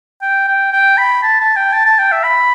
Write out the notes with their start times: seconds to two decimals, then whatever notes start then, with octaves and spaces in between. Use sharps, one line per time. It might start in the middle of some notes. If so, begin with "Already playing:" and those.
0.22 G5
0.48 G5
0.73 G5
0.98 B5
1.23 A5
1.41 A5
1.56 G5
1.73 A5
1.86 A5
1.99 G5
2.12 E5
2.24 B5